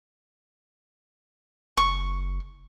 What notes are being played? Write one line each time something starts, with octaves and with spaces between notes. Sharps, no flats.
F#1 C#6